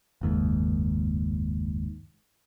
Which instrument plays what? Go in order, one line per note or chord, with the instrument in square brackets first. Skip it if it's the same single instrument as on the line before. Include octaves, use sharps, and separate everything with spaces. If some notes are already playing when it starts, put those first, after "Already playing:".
[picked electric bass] F#1 D#2 G#2